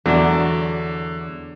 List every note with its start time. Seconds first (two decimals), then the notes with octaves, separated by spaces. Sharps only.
0.06 E2 D3 F#3 D4